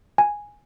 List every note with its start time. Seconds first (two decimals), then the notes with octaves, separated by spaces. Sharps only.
0.18 G#5